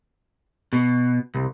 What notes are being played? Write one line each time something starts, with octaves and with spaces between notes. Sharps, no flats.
B2
C2